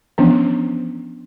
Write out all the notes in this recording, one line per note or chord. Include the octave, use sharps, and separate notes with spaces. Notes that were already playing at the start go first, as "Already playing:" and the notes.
E3 F3 B3 C#4 D4